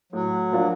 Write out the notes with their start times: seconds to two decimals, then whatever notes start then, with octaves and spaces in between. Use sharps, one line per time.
0.13 A2 F#3
0.52 F3 A#3 D4 F4